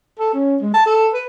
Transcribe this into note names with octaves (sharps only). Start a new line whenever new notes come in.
A4
C#4
G#3
A5
A4
B4